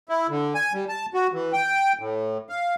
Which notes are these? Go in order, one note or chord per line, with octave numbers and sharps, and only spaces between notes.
E4
D3
G#5
G3
A5
F#4
E3
G5
A2
F5